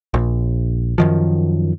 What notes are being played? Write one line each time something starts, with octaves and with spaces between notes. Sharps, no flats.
A#1
F#2 D#3 F3